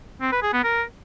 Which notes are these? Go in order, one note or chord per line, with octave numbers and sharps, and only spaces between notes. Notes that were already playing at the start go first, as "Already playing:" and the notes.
C4
B4
G#4
B3
A#4